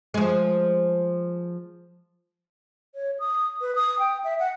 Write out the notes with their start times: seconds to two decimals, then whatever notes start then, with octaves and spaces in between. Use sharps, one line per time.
0.14 F3 G#3
2.95 C#5
3.19 D#6
3.61 B4
3.75 D#6
3.99 G5
4.24 E5
4.39 F#5